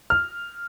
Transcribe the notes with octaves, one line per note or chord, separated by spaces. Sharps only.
F6